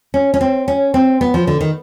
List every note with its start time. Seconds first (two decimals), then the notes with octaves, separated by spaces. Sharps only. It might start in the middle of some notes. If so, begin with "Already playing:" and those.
0.14 C#4
0.34 C#4
0.41 C4
0.68 C#4
0.94 C4
1.21 B3
1.34 F3
1.47 D3
1.61 D#3